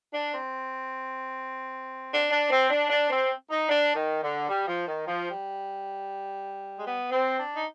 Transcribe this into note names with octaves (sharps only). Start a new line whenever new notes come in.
D4
C4
D4
D4
C4
D4
D4
C4
D#4
D4
D#3
D3
G3
F3
D#3
F3
G3
G#3
B3
C4
D4
D#4